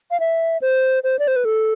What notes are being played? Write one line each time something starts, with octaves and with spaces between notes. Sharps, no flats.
F5
E5
C5
C5
D5
C5
B4
A4